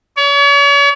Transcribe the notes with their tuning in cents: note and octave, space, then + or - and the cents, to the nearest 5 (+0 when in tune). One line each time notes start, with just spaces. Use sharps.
C#5 +40